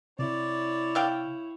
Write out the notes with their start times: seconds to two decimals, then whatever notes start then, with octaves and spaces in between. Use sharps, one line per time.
0.19 C3 E4 C#5 D5
0.95 E5 F5 G5